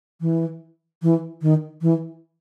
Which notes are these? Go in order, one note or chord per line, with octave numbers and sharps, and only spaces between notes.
E3
E3
D#3
E3